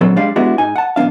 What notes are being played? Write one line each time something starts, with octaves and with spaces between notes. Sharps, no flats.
A#2 D3 F#3 C4 A4
G3 G#3 D4 G4 D5 F5
G#3 B3 D4 E4 F#4 G4
G#2 D#4 G#5
F#5 A5
B1 E2 B3 D4 F5